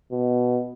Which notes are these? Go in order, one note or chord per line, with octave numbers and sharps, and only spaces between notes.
B2